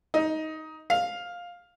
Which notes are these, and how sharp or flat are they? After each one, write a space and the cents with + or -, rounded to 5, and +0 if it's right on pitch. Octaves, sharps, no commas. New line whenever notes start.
D#4 +15
F5 +10